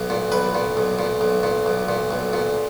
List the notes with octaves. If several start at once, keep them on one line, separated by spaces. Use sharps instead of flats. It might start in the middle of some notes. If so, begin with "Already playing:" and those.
Already playing: B1
A#2
B1 B4
A#2
B1
A#2
B1
A#2
B1
A#2
B1
A#2